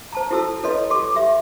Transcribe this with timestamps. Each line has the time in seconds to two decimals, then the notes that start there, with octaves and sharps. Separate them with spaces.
0.13 C5 A5 A#5
0.31 E4 F#4 A4 A5 E6
0.63 E4 A4 B4 C#5 D#5 C6
0.90 G4 A4 C6 D6
1.16 G4 E5